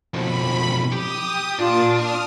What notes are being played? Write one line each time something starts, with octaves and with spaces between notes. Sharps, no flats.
B1 F2 B5
G4 D#6
A#2 D4 F4 D#6 A6
D#6 F6